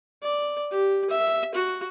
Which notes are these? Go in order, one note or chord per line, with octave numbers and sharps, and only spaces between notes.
D5
G4
E5
F#4